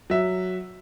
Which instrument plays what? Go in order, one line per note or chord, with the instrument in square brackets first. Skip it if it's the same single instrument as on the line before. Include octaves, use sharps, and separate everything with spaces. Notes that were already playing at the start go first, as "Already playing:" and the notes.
[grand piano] F#3 E5